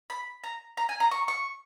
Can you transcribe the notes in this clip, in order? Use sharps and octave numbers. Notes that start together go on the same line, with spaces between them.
B5
A#5
A#5
G#5
A#5
C#6
C#6